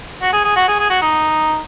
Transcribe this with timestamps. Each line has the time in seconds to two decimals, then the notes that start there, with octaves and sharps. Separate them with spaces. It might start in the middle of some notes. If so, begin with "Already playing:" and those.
0.22 F#4
0.33 G#4
0.44 G#4
0.56 F#4
0.68 G#4
0.79 G#4
0.90 F#4
1.02 D#4